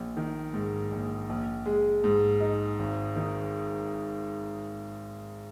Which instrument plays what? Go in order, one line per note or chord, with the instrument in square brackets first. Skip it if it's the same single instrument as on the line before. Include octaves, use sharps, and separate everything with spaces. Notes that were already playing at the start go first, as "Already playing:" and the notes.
Already playing: [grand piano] A#1
D#3
G#2
A#1
A#1
G#3
G#2
D#4
G#1
D#3